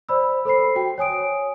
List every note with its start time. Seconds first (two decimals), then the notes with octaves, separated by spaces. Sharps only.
0.09 C5 D5 B5 E6
0.45 A4 C5 B5 C7
0.76 F#4 G5
0.98 C#5 G#5 D#6 D7